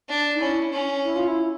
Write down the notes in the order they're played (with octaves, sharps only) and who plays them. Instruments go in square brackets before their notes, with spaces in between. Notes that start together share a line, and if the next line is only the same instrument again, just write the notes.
[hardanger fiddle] D4
[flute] D#4
[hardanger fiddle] C#4 [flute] E4
[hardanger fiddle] C#4
[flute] E4
F4
E4